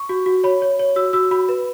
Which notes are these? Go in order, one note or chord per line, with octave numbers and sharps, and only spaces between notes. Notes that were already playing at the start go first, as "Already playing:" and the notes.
Already playing: C#6
F#4
F#4
C#5 B5
C#5
C#5
F#4 E6
F#4 E6
F#4 B5
B4